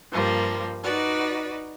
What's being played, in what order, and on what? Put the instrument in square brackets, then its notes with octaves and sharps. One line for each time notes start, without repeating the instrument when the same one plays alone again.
[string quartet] G2 F3 G3 A#3
D#4 F#4 B4 D5